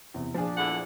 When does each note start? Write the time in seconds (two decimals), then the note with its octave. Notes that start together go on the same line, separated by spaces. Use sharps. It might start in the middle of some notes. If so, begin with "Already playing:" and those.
0.14 E2 C3
0.34 A#2 F3 D4 G#4
0.57 E2 D3 F#5